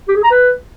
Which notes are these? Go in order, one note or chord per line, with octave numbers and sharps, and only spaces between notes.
G4
G#4
A#5
B4